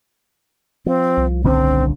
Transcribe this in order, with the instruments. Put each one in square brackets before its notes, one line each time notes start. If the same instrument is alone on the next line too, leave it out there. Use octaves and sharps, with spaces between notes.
[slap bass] F3 [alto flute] C4
[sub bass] C2
[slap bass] D#1 D3 C#4 [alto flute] C4